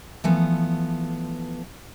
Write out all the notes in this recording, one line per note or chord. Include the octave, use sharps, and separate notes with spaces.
E3 F3 A3 B3